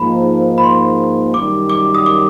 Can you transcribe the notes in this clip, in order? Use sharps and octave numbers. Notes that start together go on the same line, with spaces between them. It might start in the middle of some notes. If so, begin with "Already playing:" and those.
Already playing: G#2 F3 A#3 B5
B5
C6
F#2 D#3 G3 D6
D6
D#6
D6